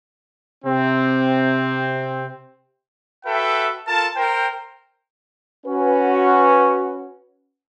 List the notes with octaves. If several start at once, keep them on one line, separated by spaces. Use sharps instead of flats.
C3 C4
F#4 A4 B4 E5 G5
F4 A4 A#4 A5
A#4 C5 G5
C#4 F#4 B4